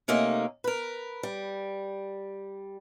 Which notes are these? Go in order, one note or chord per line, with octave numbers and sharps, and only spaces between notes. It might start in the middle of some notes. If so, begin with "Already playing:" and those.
C3 A3 A#3 C#4 D#4 D#5
A#4 B4
G3